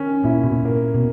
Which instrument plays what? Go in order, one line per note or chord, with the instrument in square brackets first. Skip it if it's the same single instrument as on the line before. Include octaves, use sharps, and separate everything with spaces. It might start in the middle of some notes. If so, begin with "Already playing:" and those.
Already playing: [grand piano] D#3 C#4
[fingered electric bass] A#2 [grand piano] E4
[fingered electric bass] B2
A#2
[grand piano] A#3
[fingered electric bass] B2